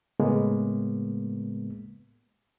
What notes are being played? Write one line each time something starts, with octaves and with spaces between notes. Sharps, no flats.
A2 C#3 G#3 A#3 B3